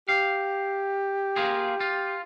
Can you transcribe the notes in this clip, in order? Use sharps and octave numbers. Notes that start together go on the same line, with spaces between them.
G4 F5
A#3 F4 G#4
F4